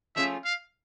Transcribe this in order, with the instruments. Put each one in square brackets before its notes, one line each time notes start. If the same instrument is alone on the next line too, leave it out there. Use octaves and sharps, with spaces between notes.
[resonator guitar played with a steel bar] F3 A3 C#4 F4 G#4 [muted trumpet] E5
[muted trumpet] F5